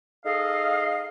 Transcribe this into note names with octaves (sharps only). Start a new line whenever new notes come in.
D#4 G#4 A4 D#5 F5